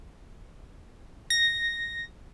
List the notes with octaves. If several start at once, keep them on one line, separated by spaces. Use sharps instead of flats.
A#6